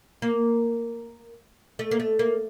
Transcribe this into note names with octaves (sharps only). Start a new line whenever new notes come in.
A#3
A3
A#3
A3
A#3